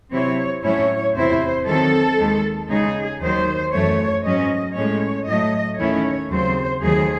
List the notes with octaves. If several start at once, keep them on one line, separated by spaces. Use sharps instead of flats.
C3 F#3 C4 E4 C#5
A2 F#3 C#4 E4 C#5
E2 C3 F#3 C4 E4 C5
D#3 F#3 C4 A4
D#2 D#3 G#3
C#3 G#3 D#4 G#4
D#2 D#3 F#3 C5
F#2 E3 A3 C#5
G#2 F#3 C#4 D#5
A2 G#3 C#4 C#5
A2 F#3 A3 D#5
D#2 D#3 A3 C#4 E4 C#5
D#2 C#3 F#3 C4 C5
D#2 D#3 F#3 A3 D#4 G#4